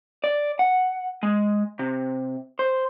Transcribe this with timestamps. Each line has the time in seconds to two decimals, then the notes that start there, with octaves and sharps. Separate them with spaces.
0.24 D5
0.59 F#5
1.23 G#3
1.79 C3
2.59 C5